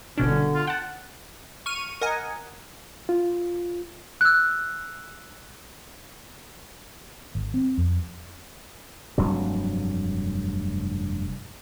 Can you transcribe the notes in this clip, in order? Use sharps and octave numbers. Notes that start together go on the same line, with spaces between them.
G1 B2 D3 C#4 D4
F4
F#5 G5 A5
C#6 F6 D#7
A#4 D#5 F#5 G#5
F4
E6 F#6
G#1
C4
F2
F1 G2 F#3